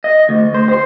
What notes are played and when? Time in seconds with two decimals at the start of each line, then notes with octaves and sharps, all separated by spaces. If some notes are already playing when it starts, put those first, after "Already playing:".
0.04 D#5
0.29 D2
0.54 C5
0.69 C5